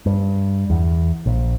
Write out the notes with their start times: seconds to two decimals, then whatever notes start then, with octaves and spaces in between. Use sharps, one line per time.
0.06 G2
0.70 E2
1.26 A#1